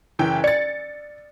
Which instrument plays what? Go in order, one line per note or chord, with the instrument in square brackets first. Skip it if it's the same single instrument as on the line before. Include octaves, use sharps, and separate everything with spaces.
[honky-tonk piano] F#1 E3 G5
[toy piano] D5 [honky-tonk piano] A6 C#7